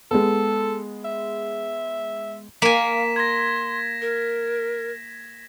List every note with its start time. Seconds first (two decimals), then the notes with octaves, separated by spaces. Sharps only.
0.11 G#3 B3 A4
1.05 E5
2.62 A#3 F5 G#5 B6 E7
3.16 C6 G#6 A#6
4.02 A#4